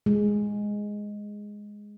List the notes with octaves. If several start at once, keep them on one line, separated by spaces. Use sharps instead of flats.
G#3